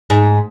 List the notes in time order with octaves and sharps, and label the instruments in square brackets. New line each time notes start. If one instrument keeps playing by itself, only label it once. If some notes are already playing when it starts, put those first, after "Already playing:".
[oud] G#2